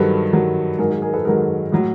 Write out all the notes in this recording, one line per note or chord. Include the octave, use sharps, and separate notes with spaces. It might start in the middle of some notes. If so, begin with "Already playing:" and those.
Already playing: G2 D#3 F#3 A4 B4
G2 D#3 F#3
G#2 D#3 F#3 G#4 A#4
G#4 A#4
G#4 A#4
A4 B4
G#2 D#3 F#3 G#4 A#4
A2 F#3